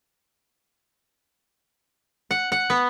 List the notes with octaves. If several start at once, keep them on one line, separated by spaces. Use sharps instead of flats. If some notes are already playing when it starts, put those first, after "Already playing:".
F#5
F#5
B3